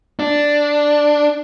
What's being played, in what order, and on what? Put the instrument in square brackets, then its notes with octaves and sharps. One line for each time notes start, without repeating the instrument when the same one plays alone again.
[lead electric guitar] D4